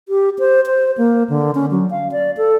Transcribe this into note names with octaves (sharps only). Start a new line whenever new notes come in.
G4
C5
C5
A#3
D3
C#4
F#3
F5
D5
A4